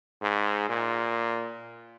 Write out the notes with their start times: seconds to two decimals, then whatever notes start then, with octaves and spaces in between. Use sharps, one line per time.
0.22 G#2
0.69 A#2